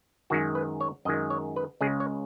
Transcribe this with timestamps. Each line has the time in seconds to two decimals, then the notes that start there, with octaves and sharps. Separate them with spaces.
0.30 F#2 D#3 G#3 F#4
0.55 B4
0.80 C#5
1.05 F#2 D#5
1.08 D#3 G#3
1.30 C#5
1.56 B4
1.81 C#2 C#3 G#3 G#4
2.00 C#5